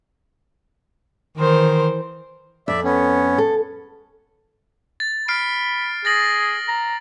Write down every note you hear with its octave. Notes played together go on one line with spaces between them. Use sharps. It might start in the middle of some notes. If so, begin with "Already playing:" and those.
D#3 E3 A#4 C5
F2 D5 E5
B3 C#4
A4
A6
B5 F6 C7 D7
G#4 A6 A#6 F#7
A#5